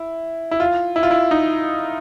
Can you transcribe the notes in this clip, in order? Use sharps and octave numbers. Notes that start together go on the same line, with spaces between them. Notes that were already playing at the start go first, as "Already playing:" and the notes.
Already playing: E4
E4
F4
E4
F4
E4
D#4